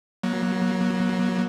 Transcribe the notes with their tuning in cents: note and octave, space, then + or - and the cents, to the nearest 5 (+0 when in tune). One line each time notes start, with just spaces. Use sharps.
F#3 +0 A#3 +35